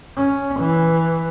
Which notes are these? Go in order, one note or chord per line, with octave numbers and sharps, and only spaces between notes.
C#4
E3